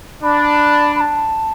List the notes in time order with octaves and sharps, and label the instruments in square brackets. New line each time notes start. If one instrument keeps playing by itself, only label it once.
[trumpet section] D4 [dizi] B5
[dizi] B5
A5